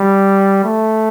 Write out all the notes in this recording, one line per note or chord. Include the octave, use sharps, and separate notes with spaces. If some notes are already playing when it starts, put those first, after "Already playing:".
Already playing: G3
A3